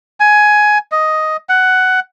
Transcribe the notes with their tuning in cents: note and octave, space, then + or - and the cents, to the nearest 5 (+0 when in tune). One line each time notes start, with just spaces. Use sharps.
G#5 +15
D#5 +5
F#5 +10